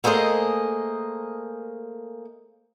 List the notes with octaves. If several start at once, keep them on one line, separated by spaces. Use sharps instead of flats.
A3 A#3 G#4 C5 D#5